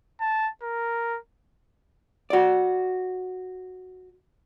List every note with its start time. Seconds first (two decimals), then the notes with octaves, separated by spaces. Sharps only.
0.21 A5
0.63 A#4
2.30 F#4 D5